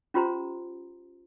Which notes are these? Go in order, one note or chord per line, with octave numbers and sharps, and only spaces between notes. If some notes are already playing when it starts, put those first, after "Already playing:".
C#4 F4 G4 C5 A#5 C6